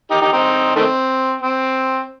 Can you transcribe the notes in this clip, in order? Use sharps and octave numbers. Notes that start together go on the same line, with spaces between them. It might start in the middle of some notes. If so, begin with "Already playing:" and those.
D#4 G4
D#4 G4
C4 D#4
D#3 A3 C4
C4